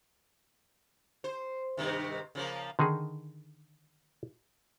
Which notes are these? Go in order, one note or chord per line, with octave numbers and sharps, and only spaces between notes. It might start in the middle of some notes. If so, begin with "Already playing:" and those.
C5
G2 C3 D#3
C#3 F3 A#3
D3 D#3 D#4 G#4